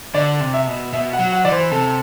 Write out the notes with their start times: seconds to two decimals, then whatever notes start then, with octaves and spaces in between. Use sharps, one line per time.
0.14 D3 D5
0.41 C3
0.54 E5
0.67 B2
0.93 B2 E5
1.13 F#5
1.19 F#3
1.32 F#5
1.45 E3 D5
1.52 C5
1.71 C3 A4